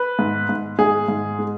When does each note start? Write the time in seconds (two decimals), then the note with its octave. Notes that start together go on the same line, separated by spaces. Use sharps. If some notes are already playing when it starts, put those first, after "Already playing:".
Already playing: B4
0.19 G#2
0.49 G#2
0.79 G#2 G#4
1.08 G#2
1.39 G#3